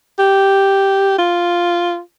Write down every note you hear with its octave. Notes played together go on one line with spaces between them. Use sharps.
G4
F4